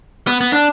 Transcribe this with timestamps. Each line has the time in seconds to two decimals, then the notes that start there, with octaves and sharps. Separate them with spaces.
0.27 B3
0.41 B3
0.53 D4